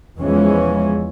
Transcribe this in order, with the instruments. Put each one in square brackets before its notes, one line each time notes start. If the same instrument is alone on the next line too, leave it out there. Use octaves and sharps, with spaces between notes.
[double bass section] E2 E3 F3 G#3 C#4